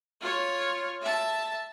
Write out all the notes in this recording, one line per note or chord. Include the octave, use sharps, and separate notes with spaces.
F4 C#5
E5 A5